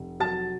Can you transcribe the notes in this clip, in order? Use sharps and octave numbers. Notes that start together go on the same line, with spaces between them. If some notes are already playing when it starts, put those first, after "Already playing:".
Already playing: F1
F#3 A5 A6